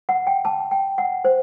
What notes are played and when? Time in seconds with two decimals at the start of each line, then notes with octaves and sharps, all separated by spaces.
0.09 F#5
0.27 G5
0.45 A5
0.71 G5
0.98 F#5
1.25 C5